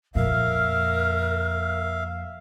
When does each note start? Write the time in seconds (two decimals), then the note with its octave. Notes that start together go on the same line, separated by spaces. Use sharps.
0.15 F2 A#2 A#4 E5 F5